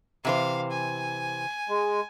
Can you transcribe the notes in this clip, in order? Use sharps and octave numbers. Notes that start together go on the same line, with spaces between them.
C3 E3 C5 F5
G#5
G#3